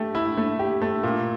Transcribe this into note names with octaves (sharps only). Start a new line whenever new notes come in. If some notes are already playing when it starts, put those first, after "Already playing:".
Already playing: A3 G4
E4
A3
G4
A3
A#2